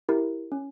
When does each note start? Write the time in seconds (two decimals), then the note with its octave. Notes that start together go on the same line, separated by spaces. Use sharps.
0.09 E4 G4 A#4
0.52 C#4